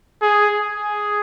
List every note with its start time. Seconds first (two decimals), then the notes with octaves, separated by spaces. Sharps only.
0.22 G#4
0.60 G#4